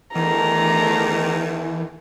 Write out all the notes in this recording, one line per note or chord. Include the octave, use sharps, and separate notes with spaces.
E2 D#3 E3 A3 D4 A#5